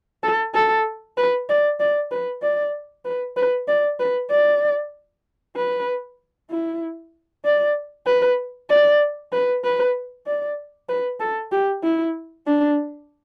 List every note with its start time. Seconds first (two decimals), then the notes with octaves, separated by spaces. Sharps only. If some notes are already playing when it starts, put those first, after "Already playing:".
0.23 A4
0.54 A4
1.17 B4
1.49 D5
1.80 D5
2.11 B4
2.42 D5
3.05 B4
3.37 B4
3.68 D5
4.00 B4
4.31 D5
5.56 B4
6.50 E4
7.45 D5
8.07 B4
8.70 D5
9.32 B4
9.64 B4
10.27 D5
10.89 B4
11.20 A4
11.52 G4
11.83 E4
12.47 D4